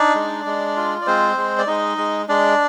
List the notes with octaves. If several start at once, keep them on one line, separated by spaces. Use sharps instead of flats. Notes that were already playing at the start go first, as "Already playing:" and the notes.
Already playing: D4 D#4 D5
G#3
G#3
F4
D5
G#3 C4 C5
G#3
D5
G#3 D#4 D#5
G#3
G#3 D4 D5